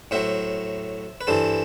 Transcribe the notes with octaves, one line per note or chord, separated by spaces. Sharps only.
A2 F#3 C5 E5
B4
G2 E3 A4 C5